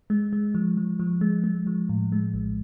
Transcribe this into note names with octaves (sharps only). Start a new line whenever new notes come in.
G#3
G#3
F3
F3
F3
G#3
G#3
F3
A2
G#3
A#1